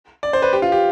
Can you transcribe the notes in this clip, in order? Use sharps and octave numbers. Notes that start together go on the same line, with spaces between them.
D5
C5
B4
G4
F4
G4